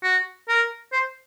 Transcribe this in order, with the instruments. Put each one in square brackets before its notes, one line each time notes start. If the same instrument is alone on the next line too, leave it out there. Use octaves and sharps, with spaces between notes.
[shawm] F#4
A#4
C5